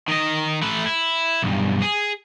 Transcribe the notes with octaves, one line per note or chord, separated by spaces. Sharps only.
D#3 D#5
A3 B4
E4
B1 G2
G#4